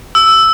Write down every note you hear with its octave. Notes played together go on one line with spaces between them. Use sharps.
E6